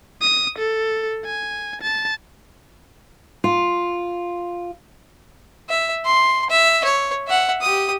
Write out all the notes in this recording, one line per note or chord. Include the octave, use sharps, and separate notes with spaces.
D#6
A4
G#5
A5
F4
E5
C6
E5
C#5
E5 F#5
G4 D#6